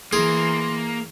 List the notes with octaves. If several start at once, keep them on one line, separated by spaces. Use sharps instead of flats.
E3 A#3 G#4 C6